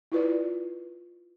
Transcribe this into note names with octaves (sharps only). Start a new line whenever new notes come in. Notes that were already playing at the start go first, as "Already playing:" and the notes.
E4 F4 B4 D5